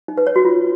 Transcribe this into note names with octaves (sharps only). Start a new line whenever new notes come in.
D#4
B4
C#5
F#4
F4